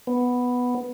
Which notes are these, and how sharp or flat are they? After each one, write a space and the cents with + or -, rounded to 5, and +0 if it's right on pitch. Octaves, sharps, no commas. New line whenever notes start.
B3 +0